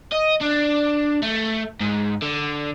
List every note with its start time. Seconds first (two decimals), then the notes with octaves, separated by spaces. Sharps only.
0.12 D#5
0.41 D4
1.22 A3
1.80 G#2
2.22 D3